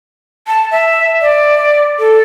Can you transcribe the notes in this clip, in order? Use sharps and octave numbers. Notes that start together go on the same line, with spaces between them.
A5
E5
D5
A4